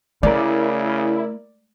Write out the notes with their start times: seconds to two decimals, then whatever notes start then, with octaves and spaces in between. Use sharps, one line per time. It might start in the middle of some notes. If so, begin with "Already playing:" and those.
0.23 C#3 A3 E4 A#4 D5